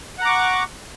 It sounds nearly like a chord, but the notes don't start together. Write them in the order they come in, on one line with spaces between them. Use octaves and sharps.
F#5 A#5 D6 C#6